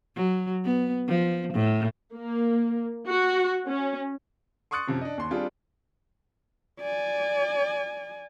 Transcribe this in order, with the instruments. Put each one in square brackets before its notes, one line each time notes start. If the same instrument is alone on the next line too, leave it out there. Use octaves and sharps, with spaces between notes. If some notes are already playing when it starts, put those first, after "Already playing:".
[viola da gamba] F#3
B3
F3
A2
[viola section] A#3
F#4
C#4
[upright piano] C6 C#6 D#6 F#6 A6 C#7
F#2 C3 F3
D4 D#5
D#2 C6
G3 C4 D4 F4 G#4
[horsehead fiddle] D5 G#5